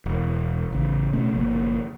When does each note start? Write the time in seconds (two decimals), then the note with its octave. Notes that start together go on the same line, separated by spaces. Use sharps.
0.06 E1
0.72 A1 C#3
1.13 B2 A3 C#4
1.33 G1 C3 F3 A#3